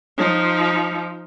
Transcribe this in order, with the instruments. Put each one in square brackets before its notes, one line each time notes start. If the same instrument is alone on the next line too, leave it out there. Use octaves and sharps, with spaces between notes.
[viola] F3 D#4